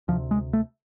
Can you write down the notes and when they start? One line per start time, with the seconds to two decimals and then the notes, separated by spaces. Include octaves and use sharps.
0.08 D2 C3 F3
0.31 G#3
0.53 A3